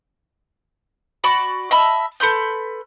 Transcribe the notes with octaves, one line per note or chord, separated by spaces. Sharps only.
F#4 D5 B5 C#6
D#5 E5 A5 B5
A4 B4 C6 G6